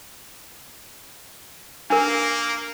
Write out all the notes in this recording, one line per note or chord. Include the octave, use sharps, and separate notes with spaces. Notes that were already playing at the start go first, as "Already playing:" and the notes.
A#3 D4 A#4